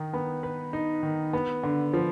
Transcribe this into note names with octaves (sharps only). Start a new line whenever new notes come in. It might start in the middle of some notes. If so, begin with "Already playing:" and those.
Already playing: D#3 D#4
B3
B4
D#4
D#3
B3
D3
F3